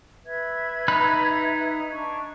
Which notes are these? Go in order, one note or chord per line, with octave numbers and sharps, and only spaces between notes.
B4 E5 G#6
D#4 B5 F#6
D4 C#6